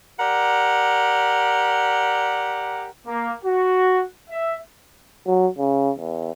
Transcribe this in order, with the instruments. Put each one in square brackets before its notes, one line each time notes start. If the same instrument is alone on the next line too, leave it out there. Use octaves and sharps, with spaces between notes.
[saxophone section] G4 A#4 D5 F#5
[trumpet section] A#3
F#4
E5
[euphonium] F#3
C#3
E2